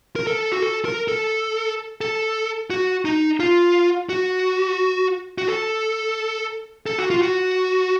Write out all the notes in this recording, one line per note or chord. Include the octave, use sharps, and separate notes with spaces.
A#4
A4
F#4
A4
A#4
A4
A4
F#4
D#4
F4
F#4
F#4
A4
A4
F#4
F4
F#4